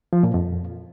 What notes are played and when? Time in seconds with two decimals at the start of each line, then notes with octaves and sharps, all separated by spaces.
0.13 F3
0.23 A#2
0.34 F2